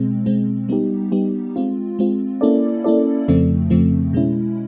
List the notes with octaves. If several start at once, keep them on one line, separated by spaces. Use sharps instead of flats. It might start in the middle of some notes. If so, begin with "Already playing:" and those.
Already playing: B2 G#3 C4
B2 G#3 C4
G3 B3 D#4 G4
G3 B3 D#4 G4
G#3 C4 F4
G#3 C4 F4
A#3 C#4 E4 A4 D5
A#3 C#4 E4 A4 D5
F2 C#3 F3 A3 C4
F2 C#3 F3 A3 C4
B2 G#3 C#4 E4